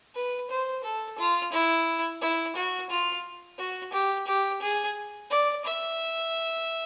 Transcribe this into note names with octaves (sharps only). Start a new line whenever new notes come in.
B4
C5
A4
F4
E4
E4
F#4
F4
F#4
G4
G4
G#4
D5
E5